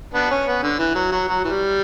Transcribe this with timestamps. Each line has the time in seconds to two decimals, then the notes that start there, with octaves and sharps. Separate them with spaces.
0.14 B3 D4
0.31 C#4
0.47 B3
0.63 D3
0.79 E3
0.95 F#3
1.12 F#3
1.28 F#3
1.45 E3 G3